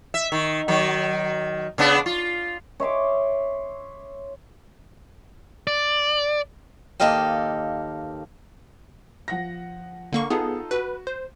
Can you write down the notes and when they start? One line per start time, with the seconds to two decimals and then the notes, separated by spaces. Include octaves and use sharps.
0.14 E5
0.32 D#3
0.68 D#3 F#3
1.78 C#3 B3 D4
2.06 F4
2.80 C#5 E5 C6 D6
5.67 D5
7.00 D#2 A#3 A4 D#5 F5 G5
9.28 F3 F#5 A#6
10.12 D3 A#3 C#6
10.30 B3 D#4 F4 G#4 A4
10.71 F#4 B4
11.07 C5